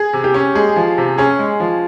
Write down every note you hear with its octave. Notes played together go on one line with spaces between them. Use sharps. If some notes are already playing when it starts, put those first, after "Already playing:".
Already playing: G#4
C3
G4
C#4
G#3 G#4
F3
C3
C#4 G#4
G#3
F3